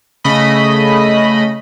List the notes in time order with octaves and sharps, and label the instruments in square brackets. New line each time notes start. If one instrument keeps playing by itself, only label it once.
[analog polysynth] C#3 A3 D#5 B5